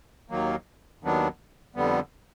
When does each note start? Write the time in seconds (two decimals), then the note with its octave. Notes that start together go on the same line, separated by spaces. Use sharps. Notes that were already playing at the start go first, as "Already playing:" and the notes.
0.30 D#2 D#3 F#3 A#3
1.03 D#2 D#3 F#3 B3 D4
1.75 F2 D3 G3 B3